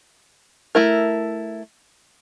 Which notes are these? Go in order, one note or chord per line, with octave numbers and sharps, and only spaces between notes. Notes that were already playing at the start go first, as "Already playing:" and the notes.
A3 E4 A#4